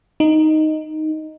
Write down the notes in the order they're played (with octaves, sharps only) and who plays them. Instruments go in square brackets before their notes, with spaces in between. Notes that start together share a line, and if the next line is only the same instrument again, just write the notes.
[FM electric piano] D#4